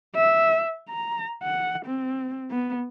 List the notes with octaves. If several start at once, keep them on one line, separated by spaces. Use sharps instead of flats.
E5
A#5
F#5
C4
B3